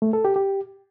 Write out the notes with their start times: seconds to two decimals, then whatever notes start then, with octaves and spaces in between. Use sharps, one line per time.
0.02 A3
0.13 A4
0.25 G4
0.36 G4